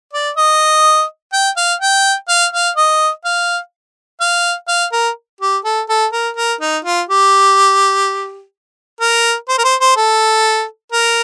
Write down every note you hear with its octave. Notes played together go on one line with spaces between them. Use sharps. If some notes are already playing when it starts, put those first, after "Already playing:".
D5
D#5
G5
F5
G5
F5
F5
D#5
F5
F5
F5
A#4
G4
A4
A4
A#4
A#4
D#4
F4
G4
A#4
C5
A#4
C5
C5
A4
A#4